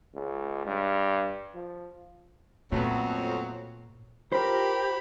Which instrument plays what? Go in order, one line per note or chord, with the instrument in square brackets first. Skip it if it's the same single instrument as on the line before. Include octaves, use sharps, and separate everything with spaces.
[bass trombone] C#2
G2
F3
[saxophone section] F2 F#3 [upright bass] A#2 [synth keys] A3 B3
[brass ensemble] F4 A#4 [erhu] G4 [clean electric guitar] C5 [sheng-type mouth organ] B5